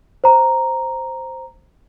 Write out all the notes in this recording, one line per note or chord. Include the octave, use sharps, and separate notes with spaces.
C5 A#5